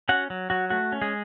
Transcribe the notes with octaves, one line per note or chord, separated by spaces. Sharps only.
C#4 F#4 F#5
F#3
F#3 F#4
A3 F#4
C#4
G#3 G#4